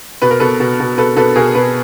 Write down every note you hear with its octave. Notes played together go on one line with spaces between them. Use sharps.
B2 B4
A#4
B2 A4 B4
B2
B2
B2 A4 B4
B2 A4 B4
B2 G#4 A#4
B2 B4